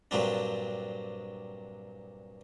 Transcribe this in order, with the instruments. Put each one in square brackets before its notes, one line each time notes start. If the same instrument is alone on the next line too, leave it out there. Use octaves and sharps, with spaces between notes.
[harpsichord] G2 A#2 F#3 C4 D4